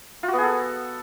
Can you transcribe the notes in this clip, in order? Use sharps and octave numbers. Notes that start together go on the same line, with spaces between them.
F4
F#4
B3
G#4
A4